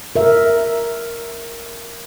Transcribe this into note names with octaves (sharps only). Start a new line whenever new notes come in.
A#4 E5